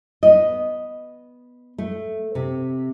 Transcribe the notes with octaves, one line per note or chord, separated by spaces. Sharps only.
B3 D#5
A3
C3